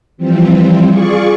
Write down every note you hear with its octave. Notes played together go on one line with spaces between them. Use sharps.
E3 F3 G3 C4
F4 G#4 D5 C#6